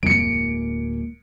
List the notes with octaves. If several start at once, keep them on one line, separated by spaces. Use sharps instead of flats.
D1 C2 F2 G#3 A#3 C#7 D7